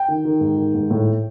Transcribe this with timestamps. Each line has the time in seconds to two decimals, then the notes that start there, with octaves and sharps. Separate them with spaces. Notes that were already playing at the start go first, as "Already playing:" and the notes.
Already playing: G5
0.08 D#3
0.25 D#3
0.41 G#2
0.57 D#3
0.74 G#2
0.90 A2